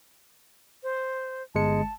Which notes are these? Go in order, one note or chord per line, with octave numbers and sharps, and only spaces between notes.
C5
G1 G#3 A5 C#7